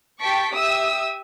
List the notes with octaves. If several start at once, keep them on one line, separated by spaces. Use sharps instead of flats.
G4 G5 A5 C#6 B6 D7
G4 E5 D#6 E6